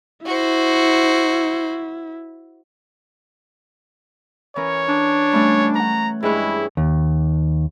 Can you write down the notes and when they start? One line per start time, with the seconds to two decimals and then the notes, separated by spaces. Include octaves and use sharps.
0.26 E4 F#4 C5
4.56 E3 C#4 A#4 C#5
4.88 D4
5.33 G3 A3 C#4
5.75 C#5 F#5 A#5
6.23 G2 G#3 E4 G#4 C#5
6.77 D#2